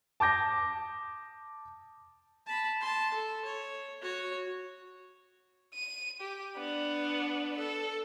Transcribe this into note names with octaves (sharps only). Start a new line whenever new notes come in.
A5 D6 G6 A#6
A5 B5
A5 C6
A4
C#5
F#4 C#5
D#7
G4
B3 D4
A4